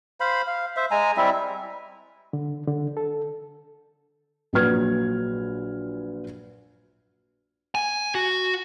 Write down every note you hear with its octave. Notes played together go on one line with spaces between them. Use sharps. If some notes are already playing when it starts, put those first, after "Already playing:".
C5 F5 B5
F5
C5 E5
G#3 G#5 A#5
G3 C4 E4 E5
D3
D3
A4
A#1 A#2 F#3 B4 F6 G#6
G#5
F#4